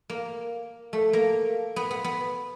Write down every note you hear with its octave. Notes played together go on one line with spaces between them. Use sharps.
A#3
A3
A#3
B3
B3
B3